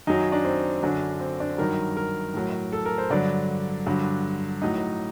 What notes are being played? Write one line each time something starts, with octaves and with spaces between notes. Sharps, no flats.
F#2 D#3 F#3 D#4
D4
C4
F#2 D3 F#3 D4
C4
D4
G2 D#3 F#3 A#4
A#4
A2 F#3
A4
A#4
C5
G2 D3 F#3 D5
G2 D3 F#3
A2 F#3 D#4